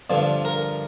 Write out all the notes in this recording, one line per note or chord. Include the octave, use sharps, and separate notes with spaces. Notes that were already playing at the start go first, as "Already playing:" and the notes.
G2 D3 F3
A#4